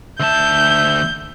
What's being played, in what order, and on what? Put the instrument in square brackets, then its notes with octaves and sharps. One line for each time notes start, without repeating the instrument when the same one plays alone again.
[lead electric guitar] D2 A5 [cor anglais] E5 [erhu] G6